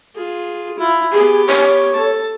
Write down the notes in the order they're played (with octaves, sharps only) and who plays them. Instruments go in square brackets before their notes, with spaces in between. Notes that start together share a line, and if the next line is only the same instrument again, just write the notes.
[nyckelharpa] F4 G#4
E4 F4
[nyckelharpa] B3 G4 [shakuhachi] G#4
[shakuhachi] C#5
[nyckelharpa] A4 A5